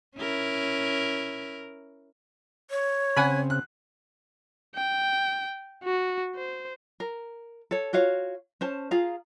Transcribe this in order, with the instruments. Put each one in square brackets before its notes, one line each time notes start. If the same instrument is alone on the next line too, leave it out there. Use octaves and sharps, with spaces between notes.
[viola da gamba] C#4 E4 A#4
[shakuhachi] C#5
[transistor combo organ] C#3 C4 [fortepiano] F#5 G#5 B5
[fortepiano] F#6
[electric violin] G5
F#4
C5
[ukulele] A#4
A4 C#5
F4 F#4 C#5 F5
C#4 C5 A5
F4 G#4 F5 A#5